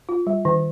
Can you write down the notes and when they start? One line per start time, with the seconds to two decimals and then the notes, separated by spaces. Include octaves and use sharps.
0.09 F4
0.27 G3
0.45 D#3